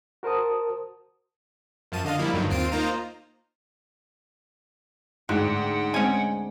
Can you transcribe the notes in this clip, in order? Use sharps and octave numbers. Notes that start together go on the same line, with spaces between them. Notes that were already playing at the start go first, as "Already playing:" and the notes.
F#4 A#4 C5 A5 D#6
F#2 F3 A5 D#7
D3 D#5 F5 D#7
F3 G3 A#3 E4
G2 D3 D#3 F#3
D#2 C4 F4 C7 D7 D#7
A#3 D#4 F4 C5 A#5
D2 G#2 F#4 F#5 G5
G#3 C4 C#4 G#5